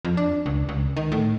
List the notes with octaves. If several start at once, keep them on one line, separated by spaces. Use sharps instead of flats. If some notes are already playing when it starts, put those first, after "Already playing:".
F2
D4
C#2
C#2
D#3
A2